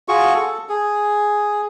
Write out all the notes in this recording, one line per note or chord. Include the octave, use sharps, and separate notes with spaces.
F4 F#4 G#4 C#6
A4
G#4